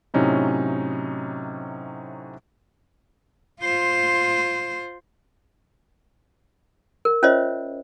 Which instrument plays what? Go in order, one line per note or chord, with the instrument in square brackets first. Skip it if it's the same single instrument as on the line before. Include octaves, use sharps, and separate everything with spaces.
[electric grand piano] A2 C3 F#3 C#4 D#4 E4
[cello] F4 C5
[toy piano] A#4
C#4 F4 C5 C#5 D#5 E5